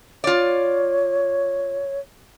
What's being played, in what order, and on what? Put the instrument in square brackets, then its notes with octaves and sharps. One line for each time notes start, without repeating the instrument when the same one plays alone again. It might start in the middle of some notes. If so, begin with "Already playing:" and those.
[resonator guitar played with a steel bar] F4 D5 [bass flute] C#5